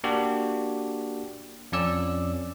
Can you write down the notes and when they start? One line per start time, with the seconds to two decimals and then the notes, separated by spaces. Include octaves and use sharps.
0.04 A#3 D4 F#4 G4
1.72 F2 C#4 D5 E6